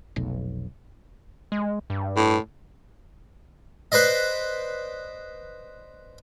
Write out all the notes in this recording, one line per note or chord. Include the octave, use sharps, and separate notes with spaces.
F1 B1
G#3
G2
A2
B4 C5 D5 D#5